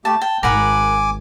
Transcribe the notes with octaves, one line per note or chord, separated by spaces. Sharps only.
A3 G4 A5
G5 A5
G#1 A#4 F#5 G#5 B5 D6